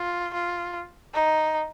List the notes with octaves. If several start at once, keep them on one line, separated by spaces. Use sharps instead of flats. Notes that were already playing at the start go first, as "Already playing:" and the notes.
Already playing: F4
F4
D#4